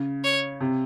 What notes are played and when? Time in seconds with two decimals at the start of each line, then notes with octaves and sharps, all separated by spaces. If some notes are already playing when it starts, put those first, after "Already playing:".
Already playing: C#3
0.24 C#5
0.60 C3